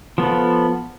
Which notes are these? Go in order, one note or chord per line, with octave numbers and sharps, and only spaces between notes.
F3 B3 A4